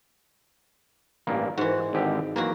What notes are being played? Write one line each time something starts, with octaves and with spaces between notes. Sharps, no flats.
A1 G2 A#3
G#2 E3 F#4
G#1 D3 G4
E2 F#3 A#3 F#4